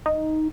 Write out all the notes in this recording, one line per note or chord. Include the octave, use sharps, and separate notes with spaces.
D#4